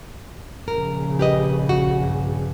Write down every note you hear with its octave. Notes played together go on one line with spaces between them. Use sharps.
A#1 C#3 A#4
G4 B4 D#5
F#4
G2